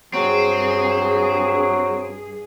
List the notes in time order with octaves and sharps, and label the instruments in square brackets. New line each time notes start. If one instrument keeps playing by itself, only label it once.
[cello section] G2 G#4 [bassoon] F#3 [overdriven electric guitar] C4